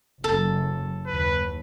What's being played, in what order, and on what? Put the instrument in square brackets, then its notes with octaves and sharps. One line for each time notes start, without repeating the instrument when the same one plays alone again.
[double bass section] F#1 F#2 [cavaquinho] A4
[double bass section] F#1 D#2 [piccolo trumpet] B4